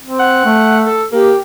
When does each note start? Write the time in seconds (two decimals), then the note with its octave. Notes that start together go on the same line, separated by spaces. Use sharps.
0.03 C4
0.19 F#5
0.45 A3
0.86 A4
1.12 A#3 G4